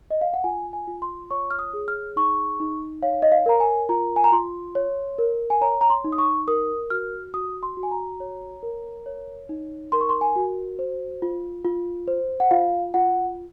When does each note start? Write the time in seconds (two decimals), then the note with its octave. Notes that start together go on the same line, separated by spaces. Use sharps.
0.11 D#5
0.21 F5
0.34 F#5
0.44 F4 G#5
0.73 G#5
0.87 F4
1.02 C6
1.31 C#5 C#6
1.51 F6
1.59 D#6
1.74 G#4
1.88 F6
2.16 D#4 C#6
2.60 D#4
3.02 C#5 F5
3.22 D#5
3.32 F5
3.46 A#4 A#5
3.60 G#5
3.89 F4 A#5
4.16 G#5
4.24 A#5
4.32 F4 C6
4.75 C#5
5.18 A#4
5.50 G#5
5.61 C#5 A#5
5.81 A#5
5.90 C6
6.04 D#4
6.12 D#6
6.18 C#6
6.47 A#4 D#6
6.90 F#4 F6
7.34 F#4 D#6
7.63 C6
7.77 F#4
7.83 G#5
7.91 A#5
8.20 C#5
8.63 A#4
9.06 C#5
9.49 D#4
9.92 A#4 C6
10.01 C#6
10.09 C6
10.21 G#5
10.36 F#4
10.79 C5
11.22 F4
11.65 F4
12.08 C5
12.40 F#5
12.51 F4 F5
12.94 F4 F#5